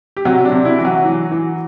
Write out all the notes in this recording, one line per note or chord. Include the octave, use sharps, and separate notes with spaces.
G4
C3 F#3 F#4
D4
C3
E4
E3
F#3 F#4
E3
E3